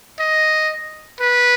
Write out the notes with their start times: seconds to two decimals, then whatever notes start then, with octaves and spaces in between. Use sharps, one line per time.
0.20 D#5
1.21 B4